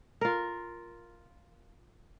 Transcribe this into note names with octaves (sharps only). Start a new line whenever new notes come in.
F4 A#4